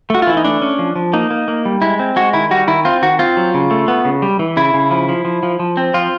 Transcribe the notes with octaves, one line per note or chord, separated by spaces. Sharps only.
A3 F#4
F4
E3 E4
D#4
A3 D4
C#4
F3
F3
A#3 D#4
A#3
A#3
G3
G#3 E4
C4
G#3 F#4
D#3 E4
G3 F#4
D#3 E4
C4 F4
D#3 F#4
C4 F4
F#3
C#3
A3
B3
C#3
G3
E3
C#3 E4
C#3
F3
F3
F3
F3
F3
C4
F3 F4